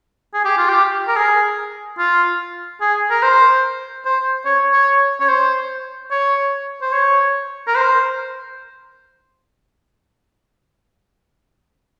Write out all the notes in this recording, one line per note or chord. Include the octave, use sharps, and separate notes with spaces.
G#4
G4
F4
G4
A#4
G#4
F4
G#4
A#4
C5
C5
C#5
C#5
C#5
C5
C#5
C5
C#5
A#4
C5